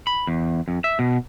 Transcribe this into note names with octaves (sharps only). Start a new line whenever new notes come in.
B5
E2
F2
E5
B2